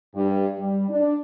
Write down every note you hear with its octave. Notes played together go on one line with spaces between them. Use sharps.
G2
G3
D4